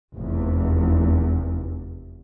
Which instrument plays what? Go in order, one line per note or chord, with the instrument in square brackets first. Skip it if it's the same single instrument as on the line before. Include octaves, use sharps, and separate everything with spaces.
[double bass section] F1 E2